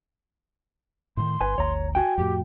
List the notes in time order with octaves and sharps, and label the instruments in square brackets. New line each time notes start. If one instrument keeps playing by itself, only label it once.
[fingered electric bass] A2 D3 D#3 [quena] C6
[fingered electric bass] G1 [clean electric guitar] B4 G#5
[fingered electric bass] G1 D2 [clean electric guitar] C#5 A#5
[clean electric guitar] F#4 G5 [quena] G#5
[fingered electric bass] F2 A2 [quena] G4